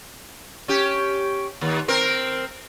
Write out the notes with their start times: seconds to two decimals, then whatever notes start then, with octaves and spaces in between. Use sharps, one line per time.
0.68 C#4 G4
1.61 D#2
1.88 C4 A#4